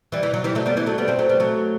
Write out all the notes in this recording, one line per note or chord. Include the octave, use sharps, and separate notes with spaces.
E3 G3
E3
F#3
E3 G3
F#3 A3
G3 B3
E3 G3
F#3 A3
G3 B3
A3 C4
F#3 A3
G3 B3
F#3 A3